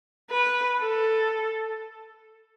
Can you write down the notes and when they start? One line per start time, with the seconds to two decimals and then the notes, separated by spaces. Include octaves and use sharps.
0.31 B4
0.80 A4